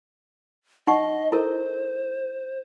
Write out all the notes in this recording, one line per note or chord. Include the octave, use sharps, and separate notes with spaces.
D#4 D#5 F#5 C#6
E4 A4 A#4 C5